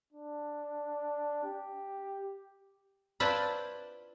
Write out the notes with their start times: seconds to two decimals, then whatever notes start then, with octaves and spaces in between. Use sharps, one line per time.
0.13 D4
1.45 G4
3.20 D4 E4 F4 B4 C5 D5